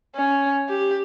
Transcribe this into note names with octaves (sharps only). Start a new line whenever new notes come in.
C#4
G4